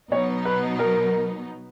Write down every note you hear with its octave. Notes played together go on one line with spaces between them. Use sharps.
B2 F#3 B3 D#4 C#5
B4
A#4